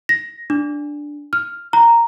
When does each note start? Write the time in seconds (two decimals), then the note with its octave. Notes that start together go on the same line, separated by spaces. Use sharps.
0.09 A#6
0.50 D4
1.33 F6
1.73 A#5